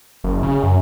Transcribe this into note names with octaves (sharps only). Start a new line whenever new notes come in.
F#1
C#3
F#2